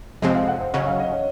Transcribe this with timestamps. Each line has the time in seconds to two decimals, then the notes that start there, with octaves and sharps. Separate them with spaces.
0.22 F2 C3 F3 G#3 C4 D#5
0.35 F5
0.48 F#5
0.60 C5
0.73 C#3 F#3 C#4 D#5
0.86 F5
1.00 D#5
1.12 C#5